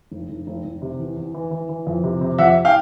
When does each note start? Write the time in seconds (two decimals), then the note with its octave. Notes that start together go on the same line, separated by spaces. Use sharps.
0.11 F1
0.29 F1
0.47 F1
0.64 F1
0.82 C3
0.99 E2
1.17 E2
1.34 E3
1.51 E3
1.69 E3
1.87 F2
2.04 C3
2.21 C3
2.38 F2 E5 F#5
2.65 F5 G5